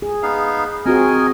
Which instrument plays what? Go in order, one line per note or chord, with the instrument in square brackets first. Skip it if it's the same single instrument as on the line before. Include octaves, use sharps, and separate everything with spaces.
[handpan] G#4
[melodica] B3 D#4 F5
[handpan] C4 F#4 G#4 [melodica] A#4 D#5 G#5